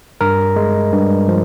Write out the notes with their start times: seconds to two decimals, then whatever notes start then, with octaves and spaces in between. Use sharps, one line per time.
0.21 G2 A#4
0.56 G#3
0.92 G2
1.28 F3